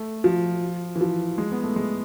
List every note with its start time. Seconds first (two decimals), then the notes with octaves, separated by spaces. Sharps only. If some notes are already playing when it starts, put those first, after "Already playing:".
Already playing: A3
0.24 F3
0.96 E3
1.01 F3
1.38 G#3
1.52 B3
1.63 A3
1.76 G#3